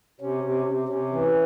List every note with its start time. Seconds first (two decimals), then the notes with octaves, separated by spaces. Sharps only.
0.20 C3 C#4
0.43 C3
0.66 C3
0.89 C3 C#4
1.12 E3